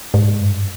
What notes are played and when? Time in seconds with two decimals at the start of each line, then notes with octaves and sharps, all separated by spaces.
0.14 G#2
0.41 G2